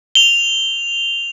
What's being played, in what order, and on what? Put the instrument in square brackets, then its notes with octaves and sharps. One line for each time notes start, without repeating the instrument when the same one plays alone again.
[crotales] F7 G7